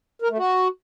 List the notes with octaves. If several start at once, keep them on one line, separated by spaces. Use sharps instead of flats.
A#4
A3
F#4